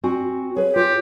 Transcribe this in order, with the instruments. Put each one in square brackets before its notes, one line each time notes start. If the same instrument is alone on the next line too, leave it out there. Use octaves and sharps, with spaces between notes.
[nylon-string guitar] C4 F#4 G#5
[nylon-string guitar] G#4 B4 [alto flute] C#5
[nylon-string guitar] F4 [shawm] G4